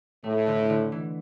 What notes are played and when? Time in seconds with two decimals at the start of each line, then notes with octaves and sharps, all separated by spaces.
0.24 A2 A3
0.47 D3
0.70 D3
0.92 E3